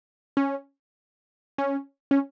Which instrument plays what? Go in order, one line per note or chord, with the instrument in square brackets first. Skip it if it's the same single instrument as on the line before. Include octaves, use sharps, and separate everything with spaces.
[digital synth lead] C#4
C#4
C#4